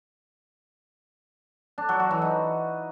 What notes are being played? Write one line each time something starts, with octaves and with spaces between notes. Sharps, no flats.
D4
F#3
F#4
E3
D#4